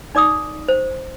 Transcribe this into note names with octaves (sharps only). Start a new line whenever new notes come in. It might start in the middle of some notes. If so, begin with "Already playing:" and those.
D#4 D5 D6 D#6
C5